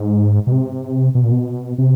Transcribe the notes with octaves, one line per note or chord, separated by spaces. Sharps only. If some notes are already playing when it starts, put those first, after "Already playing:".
Already playing: G#2
B2
C3
B2
A#2
B2
C3